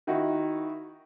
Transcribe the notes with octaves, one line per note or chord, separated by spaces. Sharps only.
D#3 D#4 E4 F#4